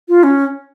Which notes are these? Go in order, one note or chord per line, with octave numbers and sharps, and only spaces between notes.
F4
C#4